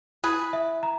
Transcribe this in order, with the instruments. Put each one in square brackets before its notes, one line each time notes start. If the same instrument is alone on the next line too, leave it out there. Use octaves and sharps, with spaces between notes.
[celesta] E4 [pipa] G#4 B4
[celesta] E5
A#5